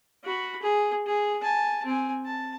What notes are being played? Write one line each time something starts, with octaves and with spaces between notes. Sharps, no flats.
F#4 B5
G#4
G#4
G#5 A5
C4 G#5
A5